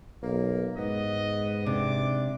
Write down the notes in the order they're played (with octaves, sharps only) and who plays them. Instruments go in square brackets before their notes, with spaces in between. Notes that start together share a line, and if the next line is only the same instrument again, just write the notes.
[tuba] B1 [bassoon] A#3
[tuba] G#2 [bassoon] B3 [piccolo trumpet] D#5
[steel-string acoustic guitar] C3 [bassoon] D4 [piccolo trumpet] D6